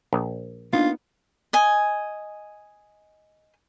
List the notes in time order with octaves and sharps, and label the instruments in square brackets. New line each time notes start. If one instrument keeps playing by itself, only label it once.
[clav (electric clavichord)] A#1
[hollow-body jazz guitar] A#3 B3 D#4 [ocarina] D4 [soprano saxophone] F4
[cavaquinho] D#5 G#5